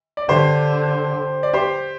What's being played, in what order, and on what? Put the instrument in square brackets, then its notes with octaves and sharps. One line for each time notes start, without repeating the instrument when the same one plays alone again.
[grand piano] D5
[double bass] D3 [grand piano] G4 C5
[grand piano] D5
G4 C5